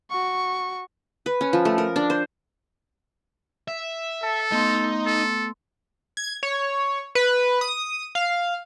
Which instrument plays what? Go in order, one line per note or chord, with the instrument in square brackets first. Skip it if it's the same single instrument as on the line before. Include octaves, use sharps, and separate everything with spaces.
[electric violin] F#4 C#6
[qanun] B4
C#4
F3
A3
A#4
D4
C5
[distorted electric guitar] E5
[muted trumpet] A4 [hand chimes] A5
[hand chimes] A3 B3 C6 [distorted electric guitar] D#4
[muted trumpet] A4
[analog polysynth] G#6
C#5
B4
D#6
F5